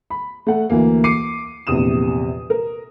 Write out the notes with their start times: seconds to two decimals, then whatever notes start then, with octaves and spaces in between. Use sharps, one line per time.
0.10 B5
0.47 A3 F#5
0.70 D2 E3 A#3
1.04 D6 C7 C#7 D#7
1.67 A#1 E2 C3 D#6 E7
2.50 A#4